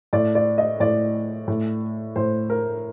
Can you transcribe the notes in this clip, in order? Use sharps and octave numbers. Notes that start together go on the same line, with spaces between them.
A2 D5
D5
D#5
A2 D5
A2
A2 C5
A#4